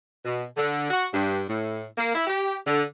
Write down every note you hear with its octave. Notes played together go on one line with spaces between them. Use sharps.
B2
D3
F#4
G2
A2
A#3
E4
G4
D3